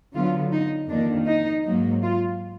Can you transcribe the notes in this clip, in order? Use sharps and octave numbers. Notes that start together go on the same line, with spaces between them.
D3 F#3 B3 F4
D#4
F2 D#3 A#3 D4
D#4
G#2 F#3 A#3
F4